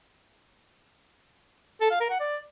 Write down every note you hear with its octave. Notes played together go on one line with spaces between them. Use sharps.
A4
F5
A#4
F#5
D5